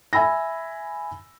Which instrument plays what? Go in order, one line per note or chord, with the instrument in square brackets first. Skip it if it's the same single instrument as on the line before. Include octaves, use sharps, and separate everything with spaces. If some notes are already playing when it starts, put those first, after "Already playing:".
[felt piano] E5 G#5 B5 E6 A#6